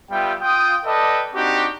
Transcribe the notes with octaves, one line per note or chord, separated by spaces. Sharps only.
G3 B3 F4 E5 G5
F4 G5 D#6
A4 B4 D5 D#5 G5 A5
C4 D4 D#4 F#4 G4